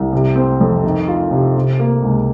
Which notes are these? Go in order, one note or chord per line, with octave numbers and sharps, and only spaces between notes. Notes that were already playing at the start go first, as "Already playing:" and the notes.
Already playing: C2
C3
C4
F2
D#3
F4
C3
C3
A#3
C#2